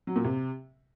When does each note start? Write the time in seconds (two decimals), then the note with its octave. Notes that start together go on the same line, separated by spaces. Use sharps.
0.07 F#3
0.16 A#2
0.24 C3